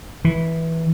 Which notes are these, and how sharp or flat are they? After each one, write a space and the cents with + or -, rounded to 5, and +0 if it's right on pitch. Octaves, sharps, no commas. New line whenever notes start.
E3 -10